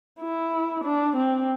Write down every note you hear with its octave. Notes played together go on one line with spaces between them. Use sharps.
E4
D4
C4